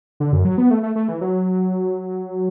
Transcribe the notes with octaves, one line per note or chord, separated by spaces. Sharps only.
D3
F#2
F#3
B3
A3
A3
A3
E3
F#3